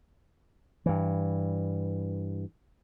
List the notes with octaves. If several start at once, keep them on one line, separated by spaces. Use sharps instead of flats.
G2 E3